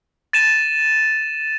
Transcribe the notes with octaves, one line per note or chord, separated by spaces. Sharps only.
A6 D#7 E7